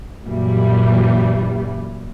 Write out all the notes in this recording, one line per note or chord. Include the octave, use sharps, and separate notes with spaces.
F#2 A#2 E3 G3